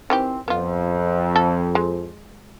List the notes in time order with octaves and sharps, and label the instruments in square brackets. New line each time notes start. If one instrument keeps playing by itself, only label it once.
[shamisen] D#3 E3 G4 [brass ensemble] C4
[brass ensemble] F2 [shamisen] B3 F4
[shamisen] A4
G#3